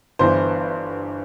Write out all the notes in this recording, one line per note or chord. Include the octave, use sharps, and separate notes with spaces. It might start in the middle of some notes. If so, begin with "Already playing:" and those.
G1 G2 E3 C5